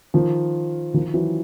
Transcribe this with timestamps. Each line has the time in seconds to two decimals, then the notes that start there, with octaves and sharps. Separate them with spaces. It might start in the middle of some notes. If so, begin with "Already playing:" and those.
0.14 D#3 F3
0.94 D#3 F3
1.14 E3 F#3